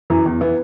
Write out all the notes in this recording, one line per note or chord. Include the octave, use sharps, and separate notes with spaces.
F#2 E3
E2
E3 B3 E4